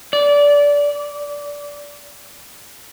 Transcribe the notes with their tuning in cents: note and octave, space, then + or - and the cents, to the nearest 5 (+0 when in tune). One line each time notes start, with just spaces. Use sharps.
D5 -20